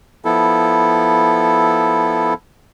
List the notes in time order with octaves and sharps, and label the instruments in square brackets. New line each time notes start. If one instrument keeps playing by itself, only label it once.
[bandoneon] F3 B3 E4 A4